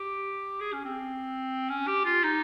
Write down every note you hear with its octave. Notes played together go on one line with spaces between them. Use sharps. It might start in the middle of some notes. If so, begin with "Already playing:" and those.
Already playing: G4
G#4
C#4
C4
C#4
G4
F4
D#4